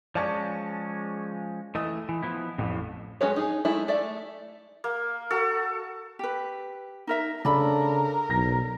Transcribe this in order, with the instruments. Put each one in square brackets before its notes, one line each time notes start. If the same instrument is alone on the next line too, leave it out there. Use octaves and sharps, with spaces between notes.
[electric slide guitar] F3 G#3 C#4 [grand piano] D5 A5 C#6
[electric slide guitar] E3 A3 [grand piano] D#5 D#6
[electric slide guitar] E3
F3 B3 E4
[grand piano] A1 [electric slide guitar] F2 A2 C3
[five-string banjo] G#3 C#4 F#4 B4 C#5
D#4 G#4
G#3 A3 D#4 E4
A3 D5 E5
[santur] A#3
F#4 A4
[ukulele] G4 B4
D#4 A#4 E5
[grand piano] C#3 D4 A4 [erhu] A#4 [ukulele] D5 B5
[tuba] B1 [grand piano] A#6